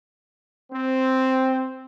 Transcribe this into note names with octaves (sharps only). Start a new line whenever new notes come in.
C4